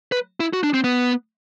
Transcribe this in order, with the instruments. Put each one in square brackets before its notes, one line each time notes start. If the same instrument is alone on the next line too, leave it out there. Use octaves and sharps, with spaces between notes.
[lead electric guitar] B4
E4
F#4
D4
C4
B3